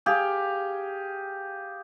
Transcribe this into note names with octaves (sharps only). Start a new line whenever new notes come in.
G4 G#4 F5